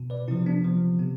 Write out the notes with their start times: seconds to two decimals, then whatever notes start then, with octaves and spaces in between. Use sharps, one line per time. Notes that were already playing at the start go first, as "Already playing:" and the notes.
Already playing: B2
0.10 B4 D5
0.28 C3 F3 C4 E4
0.46 B3 D4
0.64 C3 F3 B3
0.99 C3 B3